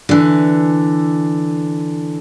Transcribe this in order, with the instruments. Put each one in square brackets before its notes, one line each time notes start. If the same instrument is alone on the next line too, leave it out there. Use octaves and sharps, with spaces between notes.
[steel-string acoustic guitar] D3 E3